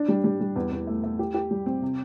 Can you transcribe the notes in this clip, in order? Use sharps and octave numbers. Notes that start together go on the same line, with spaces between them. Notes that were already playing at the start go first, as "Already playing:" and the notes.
Already playing: D4
G3
G3
G3
E2
E2
A3
A3
G4
G4
G3
C4
C3